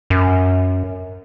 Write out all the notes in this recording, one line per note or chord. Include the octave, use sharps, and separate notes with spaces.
F#2